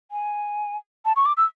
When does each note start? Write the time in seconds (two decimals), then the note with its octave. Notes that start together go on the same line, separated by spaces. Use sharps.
0.11 G#5
1.05 A5
1.16 C#6
1.26 D6
1.37 E6